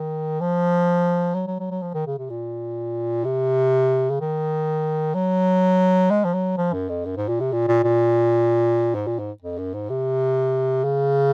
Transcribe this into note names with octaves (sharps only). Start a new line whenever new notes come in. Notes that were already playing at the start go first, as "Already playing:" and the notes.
Already playing: D#3
F3
F#3
F#3
F#3
F#3
F3
D#3
C#3
C3
A#2
C3
C#3
D#3
F#3
G#3
F3
F#3
F3
F#2
F2
F#2
G#2
A#2
C3
A#2
A#2
A#2
G#2
A#2
G#2
F2
F#2
G#2
C3
C#3